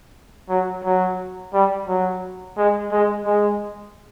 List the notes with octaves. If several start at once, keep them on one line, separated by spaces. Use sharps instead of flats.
F#3
F#3
G3
F#3
G#3
G#3
G#3